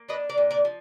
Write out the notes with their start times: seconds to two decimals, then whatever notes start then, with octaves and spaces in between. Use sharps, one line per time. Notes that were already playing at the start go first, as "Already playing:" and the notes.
Already playing: A#3
0.08 D4 B4 D#5
0.29 A#4 D5
0.38 A#2
0.51 A#4 D5
0.65 F3